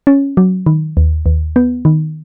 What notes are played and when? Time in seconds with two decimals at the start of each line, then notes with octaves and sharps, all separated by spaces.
0.07 C#4
0.37 F#3
0.66 D#3
0.97 D#2
1.26 D#2
1.56 B3
1.85 D#3